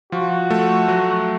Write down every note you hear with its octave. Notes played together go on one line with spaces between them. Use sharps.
F3 F#4
A3
F#3